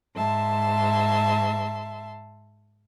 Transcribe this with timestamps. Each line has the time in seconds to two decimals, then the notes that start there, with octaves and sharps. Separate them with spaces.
0.15 G#2 E5 A5 C6